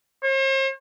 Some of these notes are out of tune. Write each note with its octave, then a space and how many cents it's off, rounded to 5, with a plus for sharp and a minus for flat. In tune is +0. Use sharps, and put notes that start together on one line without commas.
C5 +45